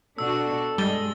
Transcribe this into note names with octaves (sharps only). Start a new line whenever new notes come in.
B2 D4 F#4 A4 E6
G2 G3 G#3 D#5 A6 G7